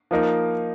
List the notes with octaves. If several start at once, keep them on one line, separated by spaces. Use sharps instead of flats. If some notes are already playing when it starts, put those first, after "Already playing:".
F3 A#3 D#4 A#4